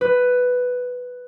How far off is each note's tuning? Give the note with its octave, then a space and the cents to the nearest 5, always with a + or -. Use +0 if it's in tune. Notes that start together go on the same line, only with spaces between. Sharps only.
B4 +5